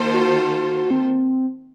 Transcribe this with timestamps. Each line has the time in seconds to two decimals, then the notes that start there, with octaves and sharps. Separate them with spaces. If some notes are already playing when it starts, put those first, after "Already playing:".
Already playing: D#3 A#3 F4 A4 C5
0.13 F#4
0.91 C4